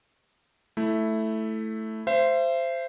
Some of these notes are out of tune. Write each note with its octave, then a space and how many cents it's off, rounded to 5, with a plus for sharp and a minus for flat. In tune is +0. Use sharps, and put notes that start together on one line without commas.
A3 +0 E4 +0
C5 -5 E5 +40